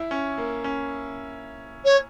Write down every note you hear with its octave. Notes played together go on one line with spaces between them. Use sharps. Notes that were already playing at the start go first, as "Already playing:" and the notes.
Already playing: E4
C#4
A#3
C#4
C#5